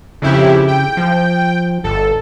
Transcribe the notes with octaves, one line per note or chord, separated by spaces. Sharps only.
F2 C#3 E4 G4
G5
F3
G1 A4